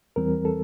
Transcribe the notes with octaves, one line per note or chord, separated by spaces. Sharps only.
E2 E3 G3 C4 A#4
A4